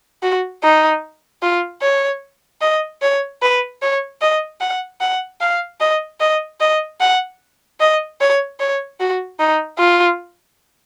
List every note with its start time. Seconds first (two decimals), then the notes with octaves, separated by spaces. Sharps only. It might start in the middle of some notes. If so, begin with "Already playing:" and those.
0.23 F#4
0.63 D#4
1.42 F4
1.82 C#5
2.61 D#5
3.02 C#5
3.42 B4
3.82 C#5
4.21 D#5
4.60 F#5
5.01 F#5
5.41 F5
5.80 D#5
6.20 D#5
6.60 D#5
7.00 F#5
7.80 D#5
8.20 C#5
8.60 C#5
9.00 F#4
9.39 D#4
9.79 F4